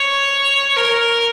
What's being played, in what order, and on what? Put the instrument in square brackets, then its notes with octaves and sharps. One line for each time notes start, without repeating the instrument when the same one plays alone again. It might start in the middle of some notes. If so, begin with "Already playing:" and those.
Already playing: [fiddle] C#5
A#4